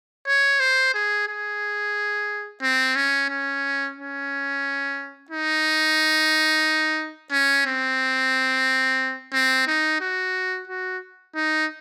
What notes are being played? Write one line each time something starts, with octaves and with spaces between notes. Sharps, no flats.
C#5
C5
G#4
G#4
C4
C#4
C#4
C#4
D#4
C#4
C4
C4
D#4
F#4
F#4
D#4